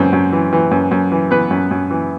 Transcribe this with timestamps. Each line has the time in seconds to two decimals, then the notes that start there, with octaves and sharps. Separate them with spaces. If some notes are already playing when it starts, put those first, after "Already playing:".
Already playing: F#2 E3 C4
0.13 F#2
0.33 E3
0.53 E3
0.71 F#2
0.91 F#2
1.12 E3
1.31 E3 B3 B4
1.51 F#2
1.71 F#2
1.91 E3